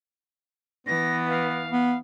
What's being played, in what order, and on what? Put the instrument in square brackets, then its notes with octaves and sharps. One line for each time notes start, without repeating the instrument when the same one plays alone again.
[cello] E3 [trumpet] B3 [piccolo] A#6
[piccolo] F5
[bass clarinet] B3